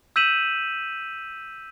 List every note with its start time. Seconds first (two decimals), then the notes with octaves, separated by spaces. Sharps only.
0.16 E6 G6 B6 D#7 E7 F#7